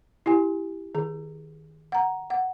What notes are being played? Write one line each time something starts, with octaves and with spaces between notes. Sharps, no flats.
E4 G4 G#5
D#3 G#4
F#5 A#5
F#5